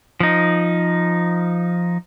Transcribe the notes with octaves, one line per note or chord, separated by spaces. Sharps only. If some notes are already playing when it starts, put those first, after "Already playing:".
F3 D#4